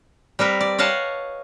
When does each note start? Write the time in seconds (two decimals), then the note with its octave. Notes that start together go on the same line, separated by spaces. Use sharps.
0.39 G3 C4 A#4 B4
0.61 D5
0.78 C#5 D#5 F5 F#5 A5